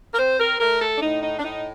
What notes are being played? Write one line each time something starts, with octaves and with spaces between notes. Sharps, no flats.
A#4
C4 C5
A#4
A3 A#4
A4
D4
A2 D#4
D#4
D4
A2 D#4